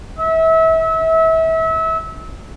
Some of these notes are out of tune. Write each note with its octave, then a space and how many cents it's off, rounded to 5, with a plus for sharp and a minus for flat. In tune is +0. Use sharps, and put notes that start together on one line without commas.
E5 -30